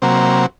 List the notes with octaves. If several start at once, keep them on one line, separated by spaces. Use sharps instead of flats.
C3 F#3 A#3